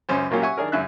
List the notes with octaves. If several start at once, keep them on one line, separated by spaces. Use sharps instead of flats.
C#2 F#2 C#4 C5
A#2 F#3 A#3 C#4 G4
E5 F#5 G#5 C#6
D#3 D4 G#4 A#4
F#2 C#3 E5 F#6